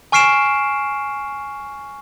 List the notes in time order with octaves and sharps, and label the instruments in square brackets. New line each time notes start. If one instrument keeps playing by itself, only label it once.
[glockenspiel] G#5 C#6 F6 C7 D7 E7